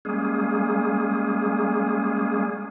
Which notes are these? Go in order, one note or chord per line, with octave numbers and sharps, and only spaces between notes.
G3 G#3 A#3 C#4 G#4